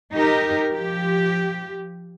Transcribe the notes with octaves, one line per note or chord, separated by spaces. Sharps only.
D#4 G4 A#4
F3 G4